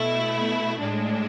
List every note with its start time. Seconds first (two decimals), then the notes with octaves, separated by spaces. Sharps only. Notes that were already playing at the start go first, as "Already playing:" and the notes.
Already playing: B2 A3 E4
0.80 A2 G#3 D4